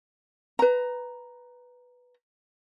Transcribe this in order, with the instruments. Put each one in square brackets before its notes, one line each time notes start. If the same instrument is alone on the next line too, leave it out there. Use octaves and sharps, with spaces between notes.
[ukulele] B4 A#5